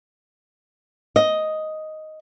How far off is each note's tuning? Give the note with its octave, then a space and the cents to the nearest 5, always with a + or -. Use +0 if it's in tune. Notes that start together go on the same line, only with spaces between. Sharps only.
D#5 +5